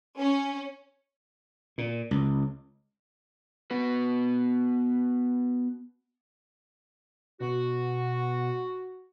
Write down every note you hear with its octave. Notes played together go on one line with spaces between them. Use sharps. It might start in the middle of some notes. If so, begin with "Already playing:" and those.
C#4
A#2
C#2
B3 F#4 B4
B2 F#4